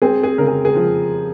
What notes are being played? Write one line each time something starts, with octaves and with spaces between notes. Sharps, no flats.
C4 G#4
G#4
C#3 A#4
G#4
G#4
F3